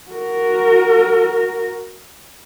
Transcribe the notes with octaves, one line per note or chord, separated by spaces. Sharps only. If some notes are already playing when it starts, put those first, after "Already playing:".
F#4 A#4